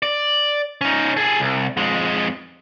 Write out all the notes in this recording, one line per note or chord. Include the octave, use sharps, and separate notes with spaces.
D5
C#4 D#4
G#4 A4
C2
F2 G#3